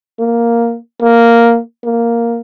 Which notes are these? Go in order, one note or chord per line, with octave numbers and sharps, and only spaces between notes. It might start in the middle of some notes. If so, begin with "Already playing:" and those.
A#3
A#3
A#3